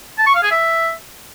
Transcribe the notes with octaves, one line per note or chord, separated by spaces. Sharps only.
A5
C#6
F5
G#4
E5